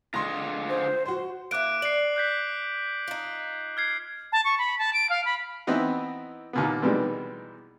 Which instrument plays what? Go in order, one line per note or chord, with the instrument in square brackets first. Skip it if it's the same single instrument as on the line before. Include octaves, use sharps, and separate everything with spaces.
[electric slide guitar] D3 G#3 F4 [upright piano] C6 A#6
[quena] C5
[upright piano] F#4 C5 [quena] C6
[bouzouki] A#3 E4 [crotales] D6 F#6 D7
[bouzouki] D5 [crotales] C7 F#7
[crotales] F#6 G6 B6
[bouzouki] D#4 F4
[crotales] F6 G#6 C7
[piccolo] A5
C#6
B5
A5
D7
F5
B5
[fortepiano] E3 B3 C4 D#4 E4
D#2 A#2 B3
B2 D#3 E3 G3 G#3